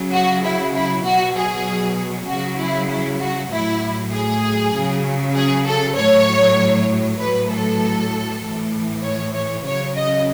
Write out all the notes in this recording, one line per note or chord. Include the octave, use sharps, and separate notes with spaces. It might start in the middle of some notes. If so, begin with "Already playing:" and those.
Already playing: C#3 F#3
F#4
E4
E4
B2 F#3 F#4
G#4
C#3 F#3 F#4
E4
E4
F#4
A2 F#3 E4
G#4
C#3 F#3
G#4
A4
A2 F#3 C#5
A2 F#3 B4
A4
A2 E3
C#5
C#5
C#3 F#3 C#5
D#5